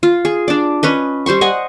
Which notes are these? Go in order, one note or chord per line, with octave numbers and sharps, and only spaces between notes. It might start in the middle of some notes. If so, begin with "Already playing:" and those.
F4
G#4
D4 D5
C#4 B4 D#5
G3 C5 C6 C#6
D#5 F#5 G#5